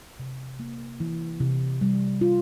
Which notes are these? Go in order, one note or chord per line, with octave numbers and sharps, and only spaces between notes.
C3
A#3
E3
C3
G3
F4